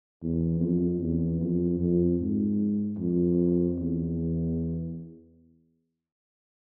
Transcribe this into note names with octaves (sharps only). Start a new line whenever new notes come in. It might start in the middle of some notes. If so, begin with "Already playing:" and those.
E2
F2
E2
F2
F2
G#2
F2
E2